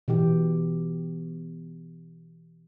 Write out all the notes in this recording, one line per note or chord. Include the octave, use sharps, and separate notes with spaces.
B2 E3 G4